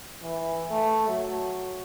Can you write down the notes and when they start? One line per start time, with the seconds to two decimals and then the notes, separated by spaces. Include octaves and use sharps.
0.23 E3
0.71 A3
1.08 F#3